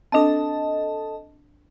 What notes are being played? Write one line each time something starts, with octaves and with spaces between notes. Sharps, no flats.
C4 D4 A4 D#5 A5